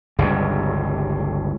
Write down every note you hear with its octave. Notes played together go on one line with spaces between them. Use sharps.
G1 C#2 G2